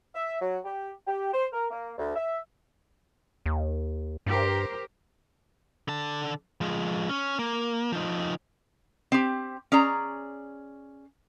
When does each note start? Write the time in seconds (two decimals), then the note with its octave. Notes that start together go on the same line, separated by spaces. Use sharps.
0.14 E5
0.41 F#3
0.65 G4
1.07 G4
1.34 C5
1.53 A#4
1.71 A#3
1.98 D2
2.16 E5
3.46 D#2
4.26 G2 G4 A#4 C5
5.88 D3 A5
6.61 F3 G#3
7.09 C#4
7.39 A#3
7.92 F3 D#4
9.12 C4 G4
9.72 C#4 G#4 D5 A#5